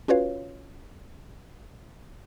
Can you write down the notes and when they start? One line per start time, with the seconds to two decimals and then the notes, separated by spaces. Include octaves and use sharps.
0.08 C#4 F4 F#4 B4 C#5 F5